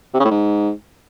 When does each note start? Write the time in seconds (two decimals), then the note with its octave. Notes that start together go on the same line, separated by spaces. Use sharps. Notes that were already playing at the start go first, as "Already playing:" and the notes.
0.14 C3
0.20 C#3
0.25 A2
0.31 G#2